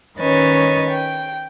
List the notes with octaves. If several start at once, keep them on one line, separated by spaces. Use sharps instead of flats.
D#3 C#4 B4 C#5 D#5 A6
G5